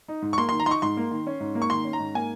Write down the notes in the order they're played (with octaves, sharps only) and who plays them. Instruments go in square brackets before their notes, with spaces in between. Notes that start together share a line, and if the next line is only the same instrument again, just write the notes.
[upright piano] D#4
G#2
C#6
A#3 C6
D#3 C6
A#5
D#4 C6 C#6
G#2 C6
A#3
D#3
C#4
G#2
A#3
C#6
D#3 C6
C#4
A#5
G#2
A#3 G#5